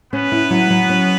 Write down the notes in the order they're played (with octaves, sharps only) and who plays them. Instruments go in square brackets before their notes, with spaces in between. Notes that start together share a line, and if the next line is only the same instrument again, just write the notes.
[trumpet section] B3 B4 [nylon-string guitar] C#4
[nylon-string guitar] E4
F#3
F#3
C#4